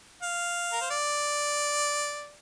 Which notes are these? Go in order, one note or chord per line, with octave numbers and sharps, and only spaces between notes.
F5
A#4
C5
D5